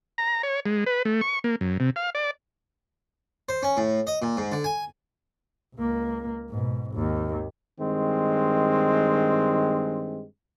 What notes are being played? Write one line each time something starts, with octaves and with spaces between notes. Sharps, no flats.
A#5
C#5
G#3
B4
A3
C#6
A#3
F#2
C3
F5
D5
C5
C#4
A2
D#5
A#2
G#2
D3
G#5
C#2 A#3
G#2 B2
G#1 D#2
G2 D#3 G#3 C4